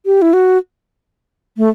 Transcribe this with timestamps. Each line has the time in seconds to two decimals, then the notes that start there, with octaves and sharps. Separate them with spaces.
0.06 G4
0.22 E4
0.33 F#4
1.57 A3